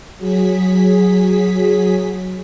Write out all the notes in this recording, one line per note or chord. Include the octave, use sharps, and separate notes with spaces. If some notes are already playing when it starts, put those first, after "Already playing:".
F#3 G#4 B6